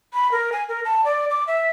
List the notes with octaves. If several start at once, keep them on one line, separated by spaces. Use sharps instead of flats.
B5
A#4
G#5
A#4
A5
D5
D6
E5